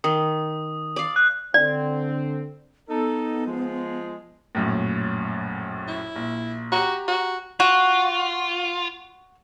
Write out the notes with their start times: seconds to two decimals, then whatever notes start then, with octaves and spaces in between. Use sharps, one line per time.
0.04 D#3 D#6
0.96 D5 F5
1.16 F#6
1.54 D3 C4 D5
2.89 B3 D#4 A4
3.46 F3 G#3
4.55 A#1 F#2 A2
5.88 E4
6.16 A#1
6.72 F#4 G4 A#5
7.08 F#4
7.60 F4 F#4